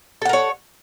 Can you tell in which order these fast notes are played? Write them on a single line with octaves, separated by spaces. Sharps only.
A4 F#5 A#4 C#5